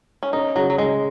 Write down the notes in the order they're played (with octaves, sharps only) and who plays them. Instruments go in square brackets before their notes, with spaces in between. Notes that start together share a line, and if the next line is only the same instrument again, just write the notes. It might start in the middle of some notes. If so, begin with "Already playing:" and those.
[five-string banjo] C#4
[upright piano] C#4 [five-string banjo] D#4
[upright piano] C#3 [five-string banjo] F#3
[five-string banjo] F#3
[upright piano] C#3 [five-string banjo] G#3